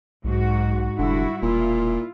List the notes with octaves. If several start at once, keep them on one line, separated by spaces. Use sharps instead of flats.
B1 G#2 F#4
F1 D3 G3 E4 F#4
E1 A#2 E4 F4